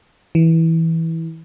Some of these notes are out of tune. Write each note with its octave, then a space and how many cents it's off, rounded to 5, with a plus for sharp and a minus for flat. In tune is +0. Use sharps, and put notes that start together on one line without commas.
E3 -15